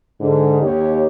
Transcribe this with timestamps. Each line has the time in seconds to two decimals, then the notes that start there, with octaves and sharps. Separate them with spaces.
0.20 G#2 D3
0.61 D#2 G4 C#5